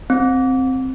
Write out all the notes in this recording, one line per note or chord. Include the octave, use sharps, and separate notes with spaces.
C4